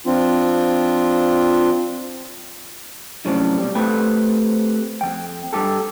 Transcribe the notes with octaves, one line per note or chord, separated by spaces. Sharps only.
F3 C4 D4 F4
F#2 A2 C3 F3 C#4 D4
B2 G3
A3 C4 G4 B4
F2 F#3 G5
G2 G4 A4